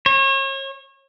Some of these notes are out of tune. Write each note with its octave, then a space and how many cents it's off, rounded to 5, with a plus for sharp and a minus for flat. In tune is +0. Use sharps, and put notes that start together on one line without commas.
C#5 -35